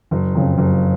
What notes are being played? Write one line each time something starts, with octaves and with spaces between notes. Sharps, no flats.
F#1
F2 C#3
F#1